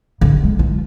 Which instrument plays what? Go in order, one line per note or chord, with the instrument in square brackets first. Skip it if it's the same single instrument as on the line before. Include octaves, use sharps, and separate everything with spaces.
[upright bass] D3
G#3
F4